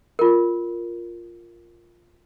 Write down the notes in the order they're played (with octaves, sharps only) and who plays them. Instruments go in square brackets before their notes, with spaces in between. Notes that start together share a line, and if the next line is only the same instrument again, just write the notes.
[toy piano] F4 A#4